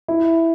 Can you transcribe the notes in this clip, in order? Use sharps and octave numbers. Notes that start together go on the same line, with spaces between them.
E4